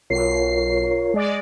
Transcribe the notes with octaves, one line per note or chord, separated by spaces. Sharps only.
B1 F4 A#4 C#5 C7
G#3 D5